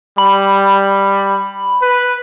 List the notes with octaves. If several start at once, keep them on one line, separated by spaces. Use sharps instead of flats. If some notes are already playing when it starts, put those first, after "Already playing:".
G3 B5
B4